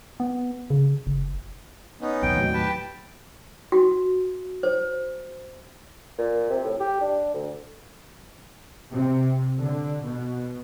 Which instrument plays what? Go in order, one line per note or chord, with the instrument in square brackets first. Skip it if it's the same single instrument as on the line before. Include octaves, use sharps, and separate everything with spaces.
[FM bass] B3
C#3
F#1
[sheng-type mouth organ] B3 C#4 D#4
[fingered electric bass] B1 E2 [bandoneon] G5
[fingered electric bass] D#2 A2 F#3
[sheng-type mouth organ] G4 B4 A5
[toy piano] F#4
C5
[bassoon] A#2
C3
A2
G4
D4
D2
[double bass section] C3
D3
B2